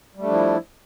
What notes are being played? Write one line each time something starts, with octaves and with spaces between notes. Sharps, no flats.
F3 G3 A3 D4 E4